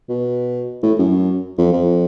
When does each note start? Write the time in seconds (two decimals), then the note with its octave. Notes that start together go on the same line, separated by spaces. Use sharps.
0.09 B2
0.83 A2
0.98 F#2
1.58 F2
1.73 F2